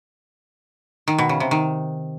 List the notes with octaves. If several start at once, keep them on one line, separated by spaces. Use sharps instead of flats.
D#3
B2
C#3
C3
D#3